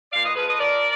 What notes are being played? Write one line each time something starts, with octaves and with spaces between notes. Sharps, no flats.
A#2 D5 F5
B4 D#5
F3 G#4 B4
B4 D#5
F3 A#4 D5